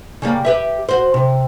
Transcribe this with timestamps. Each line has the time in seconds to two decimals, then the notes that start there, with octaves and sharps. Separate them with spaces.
0.22 C#3 G3 A#3
0.45 G4 B4 E5
0.89 F#4 C5
1.14 C3